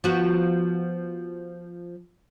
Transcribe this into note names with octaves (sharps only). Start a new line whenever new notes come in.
F3 B3 F#4